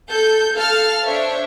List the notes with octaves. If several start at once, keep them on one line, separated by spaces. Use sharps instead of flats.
A4 G6
A4 F5 A5 F6
D4 C5 C#5 E5